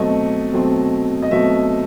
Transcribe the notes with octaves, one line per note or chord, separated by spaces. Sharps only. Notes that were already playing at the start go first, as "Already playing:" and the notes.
Already playing: B2 F#3 A3 C4 D#5
B2 F#3 A3 C4
D#5
B2 F#3 A3 C4 E5